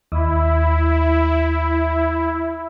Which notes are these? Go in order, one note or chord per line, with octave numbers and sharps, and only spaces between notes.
D#2 E4